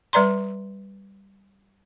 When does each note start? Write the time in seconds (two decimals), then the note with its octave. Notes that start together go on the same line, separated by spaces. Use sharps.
0.13 G3 B4 D5 A#5 C6